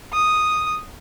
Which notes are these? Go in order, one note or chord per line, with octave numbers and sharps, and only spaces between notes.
D#6